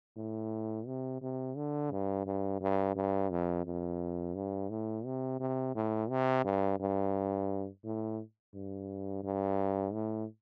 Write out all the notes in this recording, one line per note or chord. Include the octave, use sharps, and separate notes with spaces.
A2
C3
C3
D3
G2
G2
G2
G2
F2
F2
G2
A2
C3
C3
A2
C3
G2
G2
A2
G2
G2
A2